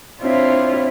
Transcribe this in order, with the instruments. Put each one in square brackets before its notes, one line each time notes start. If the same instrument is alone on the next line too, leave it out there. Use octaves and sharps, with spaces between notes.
[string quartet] C4 D4 E4 F4 C5 C#5